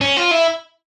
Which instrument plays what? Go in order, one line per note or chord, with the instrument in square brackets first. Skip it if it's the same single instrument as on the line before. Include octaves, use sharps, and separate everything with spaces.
[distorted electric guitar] C#4
F4
E4